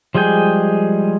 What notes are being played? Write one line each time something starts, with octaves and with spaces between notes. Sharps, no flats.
F3 G3 G#3 G#4 G5